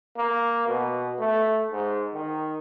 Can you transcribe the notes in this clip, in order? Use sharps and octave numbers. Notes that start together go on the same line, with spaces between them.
A#3
B2
A3
G#2
D#3